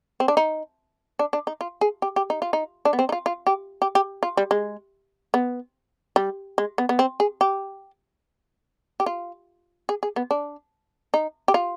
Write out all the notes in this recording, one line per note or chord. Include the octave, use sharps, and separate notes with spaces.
C4
D4
D#4
D4
D4
D#4
F4
G#4
G4
G4
D#4
F4
D#4
D4
B3
C4
D#4
F4
F4
G4
G4
G4
F4
G3
G#3
B3
G3
G#3
B3
B3
C4
G#4
G4
G4
F4
G#4
G#4
B3
D4
D#4
G4
F4